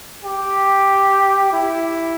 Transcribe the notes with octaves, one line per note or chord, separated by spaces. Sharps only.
G4
E4